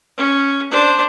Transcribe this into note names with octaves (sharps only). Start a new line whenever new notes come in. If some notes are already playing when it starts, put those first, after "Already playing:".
C#4
D4 C5